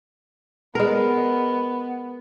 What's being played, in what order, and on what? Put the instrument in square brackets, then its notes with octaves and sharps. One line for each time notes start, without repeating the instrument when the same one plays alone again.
[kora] G#3 A#4 [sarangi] B3